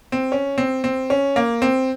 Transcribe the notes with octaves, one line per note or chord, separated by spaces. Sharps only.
C4
C#4
C4
C4
C#4
A#3
C4